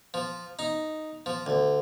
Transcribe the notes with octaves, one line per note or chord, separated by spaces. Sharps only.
F3
D#4
F3
D2